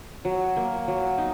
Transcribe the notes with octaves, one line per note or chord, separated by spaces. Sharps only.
F#3
A#3
F#3
D#4